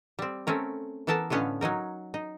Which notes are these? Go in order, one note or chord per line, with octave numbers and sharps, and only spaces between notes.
G3 C4
A3 C4 C#4 A#4
E3 B3 A4 A#4 A5
A2 D3 B3 C#4 D#5 F5
F#3 C#4 D#4 A#4
D#4